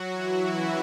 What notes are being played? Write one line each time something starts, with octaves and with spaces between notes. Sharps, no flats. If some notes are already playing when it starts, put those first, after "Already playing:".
Already playing: F#3 F#4
E3 E4
C#3 C#4